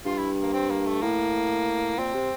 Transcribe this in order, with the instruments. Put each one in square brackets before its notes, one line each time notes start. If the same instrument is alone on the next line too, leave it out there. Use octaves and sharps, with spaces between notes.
[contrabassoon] G2 [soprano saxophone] F4
[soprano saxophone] E4
A#3
C4
A#3
A3
[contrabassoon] A2 [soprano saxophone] A#3
[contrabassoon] A#2 [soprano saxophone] C4
[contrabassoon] C3